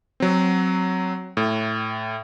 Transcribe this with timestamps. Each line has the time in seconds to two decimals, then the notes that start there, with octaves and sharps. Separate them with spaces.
0.20 F#3 C4
1.37 A2